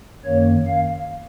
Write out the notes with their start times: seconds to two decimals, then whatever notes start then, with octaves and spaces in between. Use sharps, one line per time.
0.25 F#2 D#3 A#3 C#5
0.67 F5